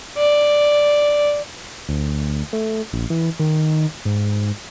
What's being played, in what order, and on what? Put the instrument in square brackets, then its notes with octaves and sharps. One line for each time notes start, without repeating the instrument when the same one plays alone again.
[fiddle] D5
[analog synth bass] D2
A3
A#1
E3
D#3
G#2